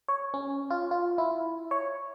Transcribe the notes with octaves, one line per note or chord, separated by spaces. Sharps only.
C#5
C#4
F4
F4
E4
C#5